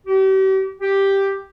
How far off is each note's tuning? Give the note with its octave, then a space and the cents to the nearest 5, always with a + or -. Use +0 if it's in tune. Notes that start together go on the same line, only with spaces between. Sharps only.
G4 -40
G4 +0